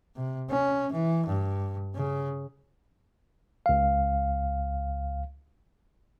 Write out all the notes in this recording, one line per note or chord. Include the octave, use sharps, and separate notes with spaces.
C3
C#4
E3
G2
C#3
C#2 F5